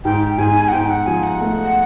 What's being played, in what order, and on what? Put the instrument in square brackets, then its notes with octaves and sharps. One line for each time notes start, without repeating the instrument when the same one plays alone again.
[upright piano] G#2 [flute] G5
[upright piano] G#2 [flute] G#5
[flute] F#5
[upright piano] G#2 [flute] G5
[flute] F#5
[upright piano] F3 [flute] G#5
[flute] F#5
[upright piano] A3